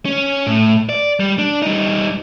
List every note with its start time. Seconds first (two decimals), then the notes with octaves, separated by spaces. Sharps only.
0.05 C#4
0.47 A2
0.89 D5
1.20 G3
1.38 D4
1.62 G3 D#4